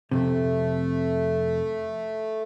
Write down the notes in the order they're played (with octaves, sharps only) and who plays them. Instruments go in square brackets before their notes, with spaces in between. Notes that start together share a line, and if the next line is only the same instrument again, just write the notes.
[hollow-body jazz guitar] F2 C3 [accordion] A3